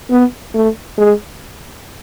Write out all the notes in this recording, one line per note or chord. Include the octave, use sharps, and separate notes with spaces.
B3
A3
G#3